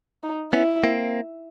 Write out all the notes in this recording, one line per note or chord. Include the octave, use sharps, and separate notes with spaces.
D#4
B3 C#4 E4
A#3 C4